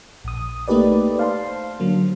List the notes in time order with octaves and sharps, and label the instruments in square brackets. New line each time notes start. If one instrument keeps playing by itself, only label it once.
[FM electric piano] A#1 D#6
A3 A#3 D#4 G4 B4 D5
C5 F5 A5 C6
D3 F#3 A#3